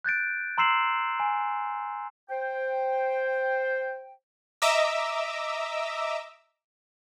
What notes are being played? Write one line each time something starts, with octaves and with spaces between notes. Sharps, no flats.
F#6 G6 A6 D7
A#5 C6 E6 C7 E7 F#7
G#5
C5 G5
D#5 E5 A#5 D6 E6